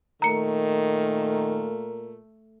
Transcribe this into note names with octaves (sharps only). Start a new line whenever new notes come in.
A#2 D#3 A3 A#4 A#5 C#7